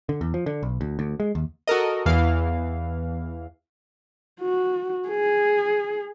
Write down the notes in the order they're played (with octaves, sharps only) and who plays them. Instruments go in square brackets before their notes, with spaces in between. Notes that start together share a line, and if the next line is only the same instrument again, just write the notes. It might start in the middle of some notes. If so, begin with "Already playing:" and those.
[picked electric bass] D3
E2
F3
D3
B1
D2
D2
G#3
D#2
[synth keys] F#4 A4 A#4 D#5
E2 E3 F5
[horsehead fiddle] F#4
G#4